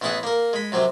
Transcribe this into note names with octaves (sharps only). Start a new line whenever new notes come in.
A1 E3 B3 E4 G#4 F#5
A#3 A#4
G#3 B5
F#2 C3 F#3 C4